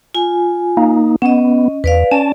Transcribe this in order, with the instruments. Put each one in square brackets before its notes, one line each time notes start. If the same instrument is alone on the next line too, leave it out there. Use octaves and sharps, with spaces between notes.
[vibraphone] F4 G#5
[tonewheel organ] A#3 D#4
[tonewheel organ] B3 [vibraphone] C#4 D#5
[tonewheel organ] E2 [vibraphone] B4 D5 F5
[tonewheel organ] C#4 A5 [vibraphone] D5